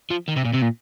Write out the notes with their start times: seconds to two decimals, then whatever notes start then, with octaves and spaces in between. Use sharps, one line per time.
0.10 F3
0.28 D#3
0.36 C3
0.45 A#2
0.53 C3
0.62 A#2